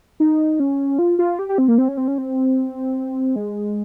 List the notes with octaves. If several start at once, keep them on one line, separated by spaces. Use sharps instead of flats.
D#4
C#4
F4
F4
G4
G4
C4
A#3
C4
C#4
C4
C#4
C4
G#3